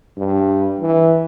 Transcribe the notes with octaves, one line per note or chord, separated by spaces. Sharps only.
G2
E3